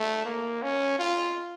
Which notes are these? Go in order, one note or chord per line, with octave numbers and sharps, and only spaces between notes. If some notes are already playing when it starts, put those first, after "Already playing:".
Already playing: A3
A#3
C#4
F4